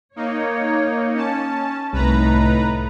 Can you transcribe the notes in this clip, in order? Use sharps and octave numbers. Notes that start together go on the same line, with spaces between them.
A#3 D#4 C#5
C#4 A5
C2 A2 A3 D#4 B4 A#5